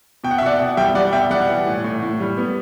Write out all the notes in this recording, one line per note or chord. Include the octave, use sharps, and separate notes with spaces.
B2 G5
F#5
E5
B2 D5 F#5
B2
G3 E5 G5
G3 D5 F#5
B2 E5 G5
G3 D5 F#5
E3
A2
A2
A2
G3
B3